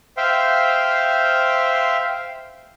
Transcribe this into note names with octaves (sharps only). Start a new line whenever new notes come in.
C5 E5 F5 G5